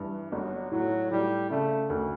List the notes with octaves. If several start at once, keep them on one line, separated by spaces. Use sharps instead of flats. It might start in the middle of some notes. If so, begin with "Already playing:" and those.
Already playing: G2 E3
G1 F#3
A2 F#3
A2 G3
C#3 A3
D2